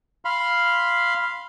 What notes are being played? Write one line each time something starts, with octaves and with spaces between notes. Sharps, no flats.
F5 B5 C6